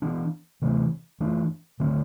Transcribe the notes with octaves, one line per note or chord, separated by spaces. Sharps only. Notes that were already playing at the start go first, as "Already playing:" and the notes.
E3 B3 D4
C3 E3 A3
E3 A3 D4
D3 A3 C4